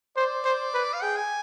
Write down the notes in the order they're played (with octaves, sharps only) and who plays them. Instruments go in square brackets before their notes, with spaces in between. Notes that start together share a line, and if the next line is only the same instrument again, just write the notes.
[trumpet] C5 [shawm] D5
[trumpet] C5
B4
[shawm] F5
[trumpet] G#4 [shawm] G5
[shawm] G#5